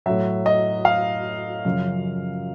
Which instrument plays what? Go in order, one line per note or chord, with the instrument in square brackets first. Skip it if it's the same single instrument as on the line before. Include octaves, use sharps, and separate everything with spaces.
[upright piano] A2 F#3 E5
D#5
F5
F#2 C#3 F3